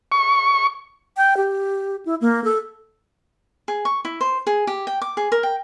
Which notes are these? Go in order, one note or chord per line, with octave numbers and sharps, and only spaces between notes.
C#6
G5
G4
E4
A#3
A4
G#4
C#6
E4
C5
G#4
G4
G5
D6
G#4
A#4
G5